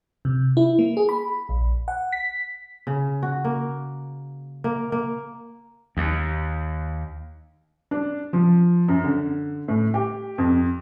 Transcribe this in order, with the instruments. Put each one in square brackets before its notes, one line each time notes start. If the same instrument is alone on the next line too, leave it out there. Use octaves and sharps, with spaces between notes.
[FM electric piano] C3
E4
A#3
G#4
B5
A#1
F#5
B6
[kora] C#3
F#4
A#3
A#3
A#3
[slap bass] D#2
[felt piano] D4
F3
F#2
D3
A2
G4
F2